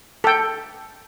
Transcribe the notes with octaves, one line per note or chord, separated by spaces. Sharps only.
A4 G5